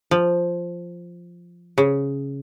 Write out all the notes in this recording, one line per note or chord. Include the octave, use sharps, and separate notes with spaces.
F3
C#3